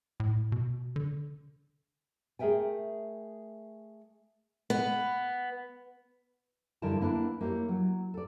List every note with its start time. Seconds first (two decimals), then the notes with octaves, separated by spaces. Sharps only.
0.20 A2
0.52 B2
0.96 D3
2.39 A3 G#4 A#4 E5 G5 G#5
4.70 B3
6.82 G2 D3 E4 A#4 A5
7.01 A#3 B3 D4 E4 B4
7.41 A#3 E4 G4 C#5
7.69 F#3
8.14 A4 D5